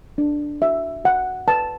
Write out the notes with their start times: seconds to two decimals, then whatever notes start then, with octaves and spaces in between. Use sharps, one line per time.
0.18 D4
0.62 F#4 E5
1.04 F#4 F#5
1.48 B4 A5